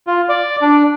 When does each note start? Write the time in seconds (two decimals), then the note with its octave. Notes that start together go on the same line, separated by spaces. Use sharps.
0.07 F4
0.29 D5
0.62 D4